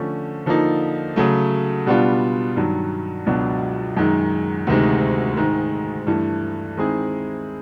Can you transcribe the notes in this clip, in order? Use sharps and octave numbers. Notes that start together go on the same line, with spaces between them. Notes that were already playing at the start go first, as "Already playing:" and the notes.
Already playing: D3 F3 A3 C#4
D3 F3 A#3 D#4
C#3 F#3 A3
B2 G3 B3 D4 F4
G2 D#3 F#3
C#2 B2 F#3 B3 D4
F#2 D#3 G#3
D2 C3 D#3 G#3
G#2 D#3 G#3
G2 E3 A3
D#3 G#3 C4 E4 G#4